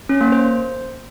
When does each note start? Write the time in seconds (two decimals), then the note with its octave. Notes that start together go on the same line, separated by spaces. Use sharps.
0.09 C#4
0.21 A#3
0.32 C5